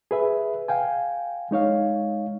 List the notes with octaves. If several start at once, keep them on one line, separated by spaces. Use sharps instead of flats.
G#4 B4 E5
F5 G5 G#5
G#3 D#4 C#5 F5